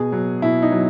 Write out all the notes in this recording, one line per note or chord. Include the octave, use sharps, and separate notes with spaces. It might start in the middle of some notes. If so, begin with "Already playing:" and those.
Already playing: B2 G#4
F#3
B2 E4
D#4
F#3